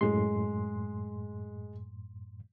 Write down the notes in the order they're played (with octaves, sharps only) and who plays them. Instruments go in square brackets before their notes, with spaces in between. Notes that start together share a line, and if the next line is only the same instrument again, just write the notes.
[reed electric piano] F#2 A2 C6 [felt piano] G#3